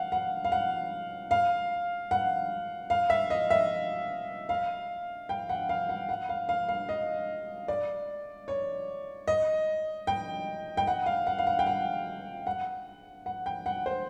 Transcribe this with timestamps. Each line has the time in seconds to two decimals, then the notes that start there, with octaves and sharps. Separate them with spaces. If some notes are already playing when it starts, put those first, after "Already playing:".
Already playing: F5 F#5
0.12 F#5
0.45 F5
0.52 F#5
1.31 F5
2.11 F#5
2.90 F5
3.10 E5
3.30 D#5
3.50 E5
4.49 F5
5.29 G5
5.49 F#5
5.69 F5
5.89 F#5
6.09 F#5
6.29 F5
6.49 F5
6.69 F5
6.89 D#5
7.68 D5
8.48 C#5
9.28 D#5
10.07 G5
10.77 G5
10.87 F#5
11.06 F5
11.27 F#5
11.39 F5
11.47 F#5
11.59 G5
11.67 F#5
12.47 F#5
13.26 F#5
13.46 G5
13.66 F#5
13.86 C5